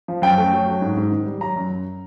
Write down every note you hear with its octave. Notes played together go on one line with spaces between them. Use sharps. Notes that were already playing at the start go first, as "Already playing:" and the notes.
F3
F#2 G5
A3
F#3
F#3
G#2
G#2
D#3
G3
F#3 A#5
F#2
F#2